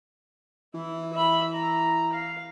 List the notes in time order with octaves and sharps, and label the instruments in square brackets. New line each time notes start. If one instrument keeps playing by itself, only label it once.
[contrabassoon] E3 [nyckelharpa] E4
[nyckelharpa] E5 B5
A#5
F5